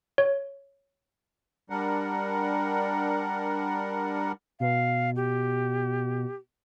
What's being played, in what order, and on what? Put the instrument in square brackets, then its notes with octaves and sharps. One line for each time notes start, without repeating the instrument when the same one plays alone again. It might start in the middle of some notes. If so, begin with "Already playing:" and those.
[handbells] C#5
[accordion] G3 D4 A#4 F#5
[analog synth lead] B2 [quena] F5
[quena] G4